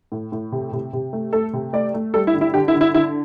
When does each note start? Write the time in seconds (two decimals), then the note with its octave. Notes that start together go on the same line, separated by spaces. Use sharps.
0.12 A2
0.32 A2
0.52 C3
0.73 C3
0.93 C3
1.13 A3
1.33 A3 A4
1.53 C3
1.73 A3 D5
1.94 A3
2.14 G3 A4
2.27 E4
2.34 D3
2.41 E4
2.54 D3 G4
2.68 E4
2.74 D3
2.81 E4
2.94 D3 E4